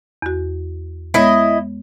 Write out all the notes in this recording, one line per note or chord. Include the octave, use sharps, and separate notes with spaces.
E2 F#4
G#3 B3 E4 C#5 D#5